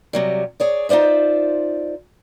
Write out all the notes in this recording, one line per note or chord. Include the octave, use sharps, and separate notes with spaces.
C3 F#3 G3
G#4 C#5 D5
D#4 F4 C5 D5 E5